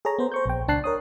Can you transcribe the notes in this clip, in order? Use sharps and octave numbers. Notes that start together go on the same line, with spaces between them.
G#4 A4 C#5 A#5
B3 C5
C5 C#6 G6
A#1 G5
C#2 D4 A5 F#6 C7
A#4 C#5 D#6